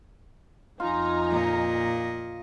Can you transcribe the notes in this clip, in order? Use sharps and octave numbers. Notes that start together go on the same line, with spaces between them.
F2 D#4 F4 G#5 A#5
A#2 D#5